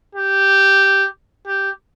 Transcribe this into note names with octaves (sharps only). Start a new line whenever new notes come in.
G4
G4